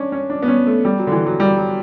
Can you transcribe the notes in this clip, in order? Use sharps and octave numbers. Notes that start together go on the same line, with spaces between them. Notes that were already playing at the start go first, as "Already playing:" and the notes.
Already playing: C#4 D4
C#4
D4
B3
C#4
A3
G3
F#3
D3
E3
F#3
G3
F#3